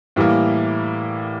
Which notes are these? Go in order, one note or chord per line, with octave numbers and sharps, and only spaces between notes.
A2 E3 G3 A#3